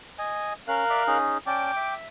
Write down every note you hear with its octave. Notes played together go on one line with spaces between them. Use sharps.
D#5 G#5
C#4 A#4 F5 F#6
D5 E5 D6
C#4 D#4 G#4
C#4 D5 G5 A5 D6
E5